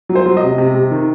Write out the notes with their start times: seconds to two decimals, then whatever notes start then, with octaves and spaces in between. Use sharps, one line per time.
0.09 F#3
0.15 C5
0.26 F#3
0.37 D#5
0.43 C3
0.58 C3
0.74 C3
0.91 D#3